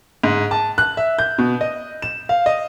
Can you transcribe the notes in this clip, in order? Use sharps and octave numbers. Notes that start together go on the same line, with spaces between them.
G#2
A5
F#6
E5
G6
B2
D#5
E7
F5
D#5